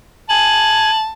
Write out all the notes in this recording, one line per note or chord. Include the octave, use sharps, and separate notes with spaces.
G#5 A5 F#7